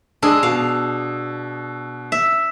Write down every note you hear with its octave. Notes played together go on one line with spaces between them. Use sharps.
G#3 D4 G#4 D#6 E6
B2 F5
E5